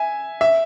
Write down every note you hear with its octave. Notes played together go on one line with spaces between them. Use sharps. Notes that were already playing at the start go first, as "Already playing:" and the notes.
Already playing: E5 G#5
E5